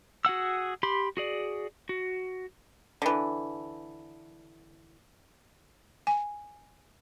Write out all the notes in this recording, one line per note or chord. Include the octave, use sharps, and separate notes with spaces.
F#4 G#4 F#5 E6
G4 B5 C6
F#4 G#4 D5
F#4
D3 E3
G#5